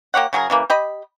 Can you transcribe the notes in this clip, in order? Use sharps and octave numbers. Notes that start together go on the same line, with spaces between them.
A#3 G4 C#5 F#5
C#3 F#3 G#4 A#4
C#3 E3 A#3
G4 D#5 B5